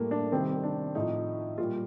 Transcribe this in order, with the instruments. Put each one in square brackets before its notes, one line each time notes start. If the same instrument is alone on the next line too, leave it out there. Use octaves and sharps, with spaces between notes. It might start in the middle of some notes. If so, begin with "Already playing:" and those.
Already playing: [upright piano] A2 G3 A3 A#3
D4
C3 D#3 G3 C4
D4
A2 F3 D#4
A#2 G3 F4